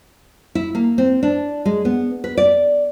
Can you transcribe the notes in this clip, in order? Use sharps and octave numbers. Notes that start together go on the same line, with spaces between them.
E4
A#3
C4
D4
G#3
B3
B4
D5